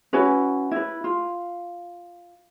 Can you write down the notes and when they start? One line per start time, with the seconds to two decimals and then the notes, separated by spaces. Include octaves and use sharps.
0.13 C#4 E4 F#4 B4
0.71 E4 B4
1.04 F4